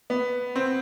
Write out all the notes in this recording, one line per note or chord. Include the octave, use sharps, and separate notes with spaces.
B3
C4